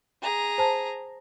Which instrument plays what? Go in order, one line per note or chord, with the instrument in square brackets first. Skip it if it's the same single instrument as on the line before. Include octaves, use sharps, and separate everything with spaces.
[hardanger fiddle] G#4 A#5
[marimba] C5 A5